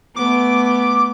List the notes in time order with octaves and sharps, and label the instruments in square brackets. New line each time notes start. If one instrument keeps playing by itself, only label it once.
[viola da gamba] A3 B3 [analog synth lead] D6